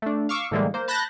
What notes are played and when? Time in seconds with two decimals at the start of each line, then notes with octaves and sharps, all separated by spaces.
0.02 A3 D4
0.29 F5 C#6 D6 E6
0.51 A2 D3 E3 G3 G#3 A#3
0.74 A#3 C5
0.88 A5 B5 F#6 G6 A6 A#6